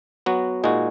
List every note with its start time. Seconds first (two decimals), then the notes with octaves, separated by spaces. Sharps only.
0.26 F#3 B3 F#4
0.64 A#2 G#3 D#4 F#4